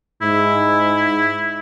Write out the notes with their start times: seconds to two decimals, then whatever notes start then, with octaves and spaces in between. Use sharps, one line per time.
0.22 G#2 E4